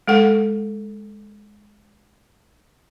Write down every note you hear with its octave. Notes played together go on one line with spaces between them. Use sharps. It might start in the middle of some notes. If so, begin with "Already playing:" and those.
G#3 A4 F#5